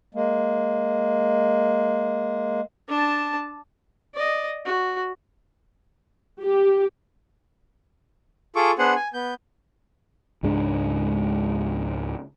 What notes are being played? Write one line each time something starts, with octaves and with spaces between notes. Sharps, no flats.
G#3 A#3
D4 A5
D5 D#5
F#4
G4
F4 G#4 A4 C#6 D6
B3 D4 G#4 C5 F#5
G#5
B3 G6
C#2 G#2 G#3 D4